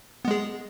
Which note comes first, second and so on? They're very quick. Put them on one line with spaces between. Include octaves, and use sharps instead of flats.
B3 G#3 G#4